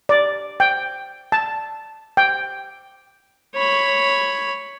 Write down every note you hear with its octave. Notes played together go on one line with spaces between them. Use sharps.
D5
G5
A5
G5
C#5 B5